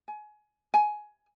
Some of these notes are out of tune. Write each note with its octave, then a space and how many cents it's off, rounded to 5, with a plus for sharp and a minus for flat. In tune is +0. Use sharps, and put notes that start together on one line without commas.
G#5 +25
G#5 +15